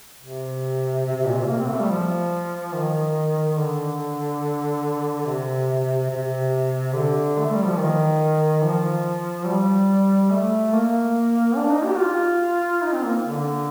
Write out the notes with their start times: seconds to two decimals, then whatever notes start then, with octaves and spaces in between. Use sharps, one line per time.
0.21 C3
1.06 C3
1.16 C3
1.27 A#2
1.38 C3
1.47 A#3
1.59 C4
1.69 A3
1.80 G3
1.90 F3
2.74 D#3
3.58 D3
5.26 C3
6.10 C3
6.94 D3
7.39 A3
7.52 G3
7.65 F3
7.78 D#3
8.62 F3
9.46 G3
10.31 A3
10.72 A#3
11.56 D4
11.70 D#4
11.85 G4
11.98 F4
12.82 D#4
12.93 C4
13.04 A#3
13.25 D3